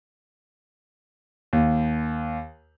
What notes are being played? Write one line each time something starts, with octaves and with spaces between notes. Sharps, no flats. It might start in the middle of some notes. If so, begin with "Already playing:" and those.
D#2